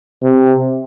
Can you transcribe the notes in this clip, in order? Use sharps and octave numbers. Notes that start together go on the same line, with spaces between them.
C3